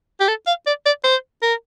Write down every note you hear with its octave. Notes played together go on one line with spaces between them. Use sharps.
G4
A4
F5
D5
D5
C5
A#4